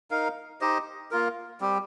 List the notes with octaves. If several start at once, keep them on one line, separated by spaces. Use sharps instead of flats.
D#4 A#4 F5
D#4 G4 C5 D#5
A#3 F4 A#4
G3 C4 G4